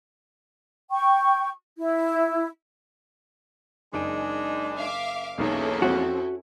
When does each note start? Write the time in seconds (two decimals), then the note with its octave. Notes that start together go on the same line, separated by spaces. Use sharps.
0.91 G5 C#6
1.78 E4
3.93 F#1 G#3 D4 D#4 G#5 D7
4.76 E5 F5 D6
5.38 B1 E2 A#3 C#4 D#4 E4 A4
5.82 F2 C4 F#4